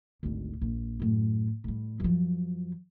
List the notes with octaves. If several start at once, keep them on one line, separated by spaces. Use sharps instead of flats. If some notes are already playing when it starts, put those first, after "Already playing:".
G#1 D2
A#1
F#2 A2
A2 G3
F#2 F3